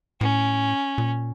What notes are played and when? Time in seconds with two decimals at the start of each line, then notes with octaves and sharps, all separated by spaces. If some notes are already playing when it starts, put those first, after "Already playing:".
0.21 A2 C#4
0.98 A#2